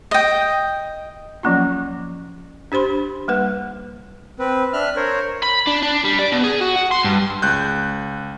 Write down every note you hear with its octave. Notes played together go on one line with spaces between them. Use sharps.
D#5 G5
F3 F#3 A#3 C#4 F4
D4 G4 C5 B5 C6
G3 A#3 B4 F#5
C4 B4
D4 E5 F6 F#6
A#4 C5 C#5
B5
D4
D4
G3
D5
B2
G#4
F#4
F#5
C6
G2
C#2 F#6 G6